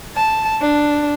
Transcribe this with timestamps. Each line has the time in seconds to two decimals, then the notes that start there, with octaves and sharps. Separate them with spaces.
0.15 A5
0.61 D4